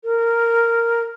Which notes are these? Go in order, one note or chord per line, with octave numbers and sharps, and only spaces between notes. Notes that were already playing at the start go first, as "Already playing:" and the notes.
A#4